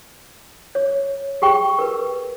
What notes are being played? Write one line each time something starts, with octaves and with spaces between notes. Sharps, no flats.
C#5
G4 G#4 G5 C#6
A#4 B4